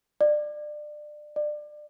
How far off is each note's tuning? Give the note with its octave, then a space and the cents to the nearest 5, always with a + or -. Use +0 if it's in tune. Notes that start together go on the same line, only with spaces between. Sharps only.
D5 +25
D5 +25